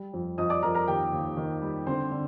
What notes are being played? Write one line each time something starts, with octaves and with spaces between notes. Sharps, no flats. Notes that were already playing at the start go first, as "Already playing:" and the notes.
Already playing: G3
F2
F2 D#5 D#6
D5 D6
F2 A#4 A#5
A#4 A#5
D#2 G4 G5
D#2
D#3
G3
D3 C4 C5
D3